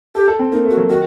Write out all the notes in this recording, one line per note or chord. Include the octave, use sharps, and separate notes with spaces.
G4 A4
A4
C4
A#3 D#4
A3
F#4
F#3
D#3 F#4